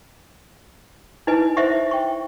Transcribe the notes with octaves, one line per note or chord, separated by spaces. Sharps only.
D#4 E4 B4 D#5 G#5
C5 D#5 E5 F#5 C#6
G5 C#6